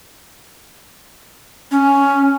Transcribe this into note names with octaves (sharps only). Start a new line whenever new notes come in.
C#4